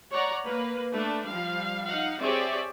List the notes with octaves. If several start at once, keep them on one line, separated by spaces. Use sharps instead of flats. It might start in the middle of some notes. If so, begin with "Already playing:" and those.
C#5 D5 F#5 A#5
A#3 B4
A3 D4 B4
F3 G3 F5
D#4 F5 F#5
C4 G4 G#4 C#5 D5 E5